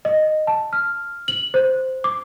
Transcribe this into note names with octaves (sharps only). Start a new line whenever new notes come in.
D#5
A5
F6
F#7
C5
D6